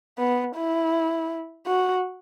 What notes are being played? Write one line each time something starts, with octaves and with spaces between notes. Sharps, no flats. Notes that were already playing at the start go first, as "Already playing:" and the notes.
B3
E4
F#4